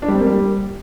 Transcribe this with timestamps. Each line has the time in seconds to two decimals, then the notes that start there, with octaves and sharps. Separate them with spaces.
0.02 D4
0.08 G3
0.14 C4
0.20 A#3
0.26 G3